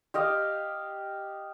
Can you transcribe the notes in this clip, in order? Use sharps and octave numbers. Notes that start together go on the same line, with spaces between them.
G4 D#5 F5